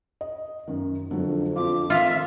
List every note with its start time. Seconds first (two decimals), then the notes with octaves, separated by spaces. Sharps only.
0.21 D#5
0.68 F#2 D#3
1.11 F2 D3 F#3
1.56 C4 D4 F4 D6
1.90 D#3 F4 E5 F5